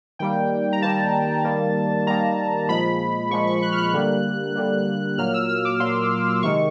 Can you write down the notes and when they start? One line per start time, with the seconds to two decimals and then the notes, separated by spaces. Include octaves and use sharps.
0.19 D#3 G3 A#3 G5
0.73 A#5
0.82 D#3 G3 A#3 A5
1.44 D#3 G3 A#3
2.07 D#3 G3 A#3 A#5
2.69 A#2 F3 G#3 B5
3.31 A#2 F3 G#3 C#6
3.47 C#6
3.62 F#6
3.72 F6
3.78 F#6
3.94 D3 G3 A#3
4.55 D3 G3 A#3
5.18 A#2 F#3 A#3 F6
5.34 E6
5.49 E6
5.65 D6
5.80 A#2 F#3 A#3 C6
6.43 C3 D#3 G#3 C#6